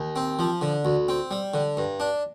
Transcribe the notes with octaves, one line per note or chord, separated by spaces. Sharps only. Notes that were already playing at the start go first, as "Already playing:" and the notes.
Already playing: D#2
C4
F3
D3
D2
C4
G3
D3
G2
D4